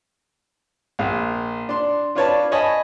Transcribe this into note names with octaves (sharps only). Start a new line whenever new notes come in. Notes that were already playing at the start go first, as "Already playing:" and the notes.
A#1 F5
D4 C6
D4 F4 B4 C#5 D5 A5
C#5 D#5 G#5 A5 B5